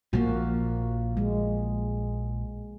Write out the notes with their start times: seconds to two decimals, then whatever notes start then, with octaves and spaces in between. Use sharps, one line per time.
0.13 A#1 F3 A#3 F#4
1.17 G#3